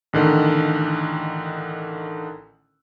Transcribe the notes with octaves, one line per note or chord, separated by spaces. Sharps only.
A1 D3 D#3